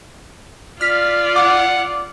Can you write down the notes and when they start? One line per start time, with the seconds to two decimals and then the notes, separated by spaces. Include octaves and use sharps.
0.81 F4 D5 F6 B6
1.36 F#5 D6